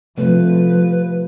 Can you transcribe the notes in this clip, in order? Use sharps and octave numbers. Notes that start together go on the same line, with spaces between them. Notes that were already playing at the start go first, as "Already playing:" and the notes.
C3 F3 A3 B4